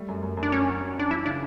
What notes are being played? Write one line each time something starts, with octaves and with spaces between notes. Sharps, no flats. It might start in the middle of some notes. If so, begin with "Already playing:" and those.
Already playing: G3 A3
F#2
F#2
F#2
D4
F#3 C#4
F#4
C#4
C#4 D4
E3 E4
C#3 D4